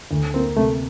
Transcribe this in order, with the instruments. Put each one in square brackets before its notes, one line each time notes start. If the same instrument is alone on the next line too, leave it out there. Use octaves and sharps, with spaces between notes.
[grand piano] D2
[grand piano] A#3 [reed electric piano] C4
[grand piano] C3 [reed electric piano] A3